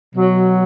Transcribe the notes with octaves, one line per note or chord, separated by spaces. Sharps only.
B2 F#3